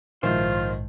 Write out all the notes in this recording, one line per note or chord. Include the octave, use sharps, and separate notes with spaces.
A#1 G#2 D#3 F3 E4 F4 C5